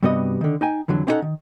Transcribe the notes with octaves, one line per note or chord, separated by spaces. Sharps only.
G2 C3 G3 B3 F#4 D#5
D3 D#3
D#4 G5 G#5
F2 D3 E3 F#3
C4 C#4 D#4 F4 A4 F#5
D#3